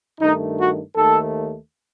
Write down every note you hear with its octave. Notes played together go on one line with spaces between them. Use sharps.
G2 D#3 A3 D#4
F#4
D#2 D#3 A3 A4